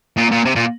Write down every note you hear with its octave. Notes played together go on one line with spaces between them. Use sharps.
A#2
A#2
C3
A#2